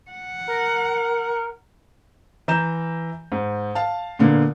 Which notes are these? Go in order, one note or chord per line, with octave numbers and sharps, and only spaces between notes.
F#5
A#4
E3 A#5 G6 E7
G#2
F5 A5
A#2 D3 A#3 B3